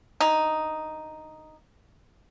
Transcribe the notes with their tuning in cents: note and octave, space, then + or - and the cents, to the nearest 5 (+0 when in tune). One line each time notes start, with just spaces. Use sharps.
D3 +15 D#4 +0